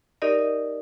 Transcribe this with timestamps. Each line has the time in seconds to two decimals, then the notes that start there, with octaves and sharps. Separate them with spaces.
0.22 D#4 G4 A#4 D5 D#5